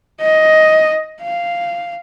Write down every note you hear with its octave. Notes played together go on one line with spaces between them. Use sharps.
D#5
F5